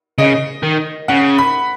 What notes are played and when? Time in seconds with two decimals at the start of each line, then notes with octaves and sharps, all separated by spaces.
0.18 C#3 D#5
0.63 D#3
1.08 C#3 F#5
1.38 B5